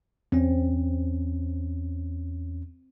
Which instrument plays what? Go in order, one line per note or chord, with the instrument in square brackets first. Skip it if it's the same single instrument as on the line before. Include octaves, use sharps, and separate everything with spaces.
[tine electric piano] E2 C#4 [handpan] C4